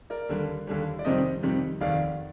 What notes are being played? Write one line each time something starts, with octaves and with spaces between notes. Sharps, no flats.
A#4 D5
D#2 D3 G3
D#2 D3 G3
D5
F2 C3 D#3 G3 C5 D#5
F2 C3 D#3 G3
F1 D#2 D#3 D5 F5